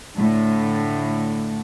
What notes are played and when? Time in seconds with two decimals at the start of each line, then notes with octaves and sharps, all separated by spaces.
0.16 A2 D3